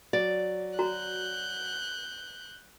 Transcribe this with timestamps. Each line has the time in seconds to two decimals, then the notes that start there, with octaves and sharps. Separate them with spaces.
0.13 F#3 D5
0.79 F#4 A#5 F#6 G6